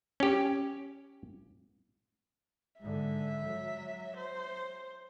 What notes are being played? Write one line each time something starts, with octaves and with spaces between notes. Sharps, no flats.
C#4 G4
G#2 D3 E5
F#3
C5